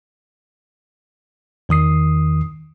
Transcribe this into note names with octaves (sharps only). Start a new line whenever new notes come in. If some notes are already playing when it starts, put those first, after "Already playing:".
E2 D#3 D#6 C7